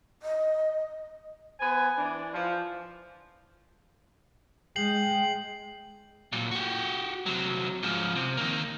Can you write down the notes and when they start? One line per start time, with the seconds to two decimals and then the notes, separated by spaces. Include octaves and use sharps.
0.22 D#5
1.60 B3 C5 G#5
1.97 E3 D4
2.33 F3
4.76 G#3 G5 C7 F#7
6.32 A#2 F#3
6.51 F#4 G4
7.26 C3 F#3
7.83 G#2 F3
8.15 C3
8.37 D#3 A#3